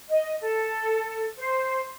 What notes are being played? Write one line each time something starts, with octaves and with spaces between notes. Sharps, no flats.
D#5
A4
C5